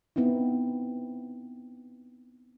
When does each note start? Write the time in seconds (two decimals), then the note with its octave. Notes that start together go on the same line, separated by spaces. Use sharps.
0.16 B3 C4 D#4 E4